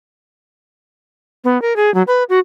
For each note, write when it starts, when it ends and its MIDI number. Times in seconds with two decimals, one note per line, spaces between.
1.44 1.60 59
1.62 1.76 70
1.76 1.93 68
1.94 2.02 54
2.07 2.23 71
2.29 2.39 66